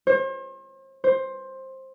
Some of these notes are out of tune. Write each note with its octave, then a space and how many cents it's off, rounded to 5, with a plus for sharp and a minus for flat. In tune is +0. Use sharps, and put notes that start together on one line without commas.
C5 +40
C5 +15